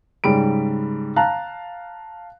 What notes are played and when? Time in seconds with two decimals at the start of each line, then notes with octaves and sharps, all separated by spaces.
0.24 G#2 C#3 G3 B5 D7
1.16 F5 A5 A#5 F#6